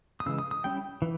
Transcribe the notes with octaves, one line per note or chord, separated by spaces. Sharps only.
D#6
C#3 E3 G#3 E6
D#6
D#6
G3 C#4 E4 G5
E3